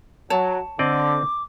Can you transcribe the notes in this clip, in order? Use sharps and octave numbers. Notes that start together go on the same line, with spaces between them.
F#3 C#5 A5
D3 C4 D5 D#5 D6